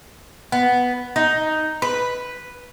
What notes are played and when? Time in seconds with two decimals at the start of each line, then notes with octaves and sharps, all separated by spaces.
0.52 B3
1.16 D#4
1.82 B4